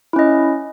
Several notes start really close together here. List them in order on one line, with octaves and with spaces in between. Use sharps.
E4 C#4 D#5